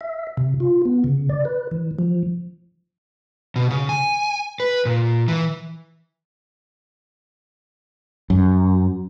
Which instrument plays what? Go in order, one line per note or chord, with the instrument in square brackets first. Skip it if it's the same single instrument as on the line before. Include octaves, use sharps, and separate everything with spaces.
[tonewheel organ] E5
C3
F4
B3
C#3
D5
B4
E3
F3
[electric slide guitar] B2
C#3
G#5
B4
A#2
E3
[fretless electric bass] F#2